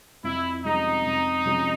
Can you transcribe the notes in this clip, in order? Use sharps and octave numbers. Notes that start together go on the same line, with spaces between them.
F2 E4
C3 F3 G#3 C#4 D#4
F2
C3 F3 G#3 C#4